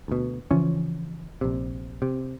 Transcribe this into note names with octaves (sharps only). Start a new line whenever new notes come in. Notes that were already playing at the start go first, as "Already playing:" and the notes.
D2 B2
C#3 E3 F3 C#4
A#1 C3
C3